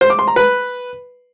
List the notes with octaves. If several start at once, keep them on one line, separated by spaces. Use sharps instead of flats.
C5
D6
C6
A#5
B4